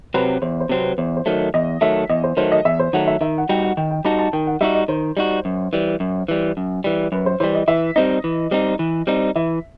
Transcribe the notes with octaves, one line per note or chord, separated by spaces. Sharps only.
C3 F#3 C4 B4
E2 C5
C5
C3 F#3 C4
B4
E2 C5
C5
D#3 F#3 A3
E2 D#5
D#3 F#3 A3 E5
E2 D#5
C5
D#3 F#3 A3 C5
D#5
E2 E5
C5
D#3 F#3 A3 F#5
E5
D#3 E5
F#5
G3 D#4 F#4 G5
F#5
D#3 G5
G5
G3 D#4 F#4 A5
A5
D#3 G5
F#5
G3 D#4 F#4 E5
D#5
D#3 C5
G3 D#4 F#4
F#2
E3 G3
F#2
E3 G3
F#2
E3 G3
F#2 B4
C5
E3 G3 C5
D#5
E3 E5
G3 C4 D#4 D#5
E3
G3 C4 D#4
E3
G3 C4 D#4
E3 E5